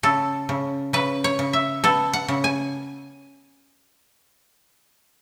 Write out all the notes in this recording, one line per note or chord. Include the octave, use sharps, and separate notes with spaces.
C#3 A4
C#3
C#3 B4
C#5
C#3
E5
B3 A4
F#5
C#3
G#5